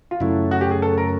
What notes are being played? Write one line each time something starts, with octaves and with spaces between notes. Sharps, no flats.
F4
F#2 C#3 F#3 A3 E4
F#4
G4
G#4
A4
A#4